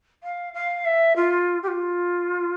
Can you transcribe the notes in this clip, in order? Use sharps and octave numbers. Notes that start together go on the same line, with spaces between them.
F5
F5
E5
F4
G4
F4